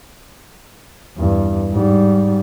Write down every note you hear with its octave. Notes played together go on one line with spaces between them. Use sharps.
E2 G2
G#2 G3